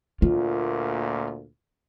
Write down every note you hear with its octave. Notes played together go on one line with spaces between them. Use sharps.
D2 A#2 F4